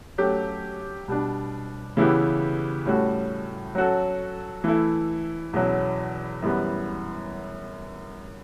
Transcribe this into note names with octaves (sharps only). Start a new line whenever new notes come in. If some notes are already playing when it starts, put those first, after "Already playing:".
F#3 A3 C#4 G4
B2 G3 D4
C#3 E3 B3 E4 G4
A2 G3 C#4 F#4 A4
F#3 C#4 F#4 A4
E3 A3 E4
E2 B2 F#3 C#4 E4
F#2 E3 G3 B3